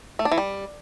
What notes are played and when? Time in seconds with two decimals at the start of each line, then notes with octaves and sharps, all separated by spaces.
0.19 A3
0.25 D4
0.32 E3
0.38 G3